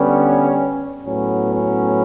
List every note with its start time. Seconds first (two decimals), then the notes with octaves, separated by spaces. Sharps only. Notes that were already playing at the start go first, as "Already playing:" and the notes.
Already playing: D3 G3 B3 C#4
1.05 A2 F#3 B3 C#4
1.54 C#4